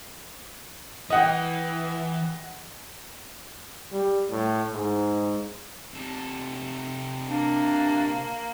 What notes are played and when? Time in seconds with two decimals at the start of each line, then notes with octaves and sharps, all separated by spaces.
1.10 E3 D#5 F#5 G5
3.92 G3
4.29 A2
4.72 G#2
5.94 C3 A4
7.28 A#3 D4